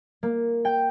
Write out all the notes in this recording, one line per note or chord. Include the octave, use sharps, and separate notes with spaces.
A#3
G5